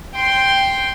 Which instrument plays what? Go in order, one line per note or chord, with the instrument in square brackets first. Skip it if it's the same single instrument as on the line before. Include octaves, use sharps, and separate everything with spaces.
[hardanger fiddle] G5 C6